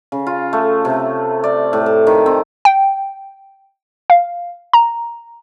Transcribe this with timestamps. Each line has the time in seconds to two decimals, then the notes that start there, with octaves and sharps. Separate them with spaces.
0.12 C#3
0.27 F4
0.53 A3
0.85 C3
1.44 D5
1.73 A2
1.86 A5
2.07 D#3
2.26 C4
2.65 G5
4.10 F5
4.73 A#5